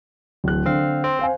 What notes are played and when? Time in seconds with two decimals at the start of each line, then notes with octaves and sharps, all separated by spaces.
0.44 D1 F#6
0.66 D3 C4 F5
1.04 C4 C6
1.19 C5 F5 G#5